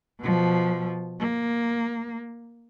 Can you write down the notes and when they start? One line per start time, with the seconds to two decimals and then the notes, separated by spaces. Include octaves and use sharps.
0.20 B2 F3
1.20 A#3